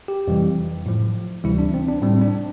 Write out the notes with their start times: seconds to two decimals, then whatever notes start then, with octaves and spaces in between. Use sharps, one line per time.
0.08 G4
0.28 F2 C3 E3 G3
0.86 A2 F3
1.44 D2 C3 E3 G3 E4
1.59 D4
1.74 C4
1.89 D4
2.02 A2 G3 C4
2.22 D4